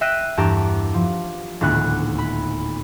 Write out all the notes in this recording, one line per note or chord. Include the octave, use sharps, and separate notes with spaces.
E5 G5 F#6 A#6 C7 D#7
E2 G2 G4 A5 A#5
F3
D#1 D2 A2 B3 F#6
B5